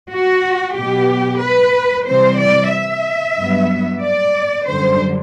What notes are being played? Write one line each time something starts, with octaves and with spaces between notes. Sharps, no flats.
F#4
B2 F#3 B3 G4
B4
C3 E3 G3 C4 C5
D5
E5
G2 F#3 B3
D5
F#2 D3 G3 C5